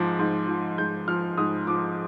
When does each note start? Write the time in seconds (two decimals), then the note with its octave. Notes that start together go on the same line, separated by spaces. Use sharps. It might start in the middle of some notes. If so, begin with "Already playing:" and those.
Already playing: G#2 F3 D6
0.19 G#2
0.48 F3
0.78 G#2 G6
1.08 F3 F6
1.38 G#2 D#6
1.67 F3 D6